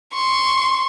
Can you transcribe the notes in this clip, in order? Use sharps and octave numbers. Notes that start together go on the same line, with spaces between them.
C6 C#6